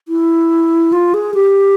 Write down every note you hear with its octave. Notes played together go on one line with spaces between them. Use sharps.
E4
F4
G#4
G4